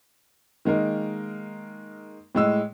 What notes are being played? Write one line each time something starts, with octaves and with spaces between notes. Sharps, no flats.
D#3 G#3 A#3 A#4
A2 G#3 E6